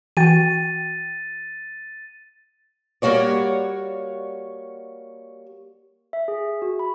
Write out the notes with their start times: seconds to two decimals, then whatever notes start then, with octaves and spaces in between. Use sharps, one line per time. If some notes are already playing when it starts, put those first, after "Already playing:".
0.17 E3 F#4 G5 A6 D#7
3.02 G3 A#3 F#4 C#5 D5
6.13 E5
6.28 G#4
6.62 F#4
6.79 B5